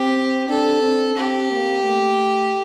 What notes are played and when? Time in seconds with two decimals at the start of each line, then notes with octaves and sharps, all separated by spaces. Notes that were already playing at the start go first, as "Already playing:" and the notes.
Already playing: C4 G4
0.48 D4 A4
0.82 C4
1.16 C4 G4
1.51 A#3
1.85 A3